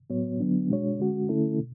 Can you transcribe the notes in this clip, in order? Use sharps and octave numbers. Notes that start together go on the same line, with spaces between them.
A2 F#3 B3 F#4 C#5
D3 F#3 B3 D4
B2 G#3 D4 F#4 C#5
D3 G#3 C#4 F#4
D3 A3 C#4 E4 A4
B2